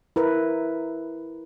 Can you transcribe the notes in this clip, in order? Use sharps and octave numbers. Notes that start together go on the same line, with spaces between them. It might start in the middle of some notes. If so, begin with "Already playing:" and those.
E4 A#4 B4